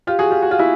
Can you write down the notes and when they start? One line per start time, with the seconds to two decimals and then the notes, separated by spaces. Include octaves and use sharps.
0.07 F4 G4
0.19 F#4 G#4
0.31 F4 G4
0.42 F#4
0.51 F4
0.59 E4 F#4